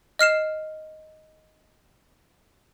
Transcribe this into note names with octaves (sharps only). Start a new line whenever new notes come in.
D#5 F6 C7 E7